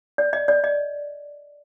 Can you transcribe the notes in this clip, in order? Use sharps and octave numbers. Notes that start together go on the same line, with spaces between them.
D5
D#5
D5
D#5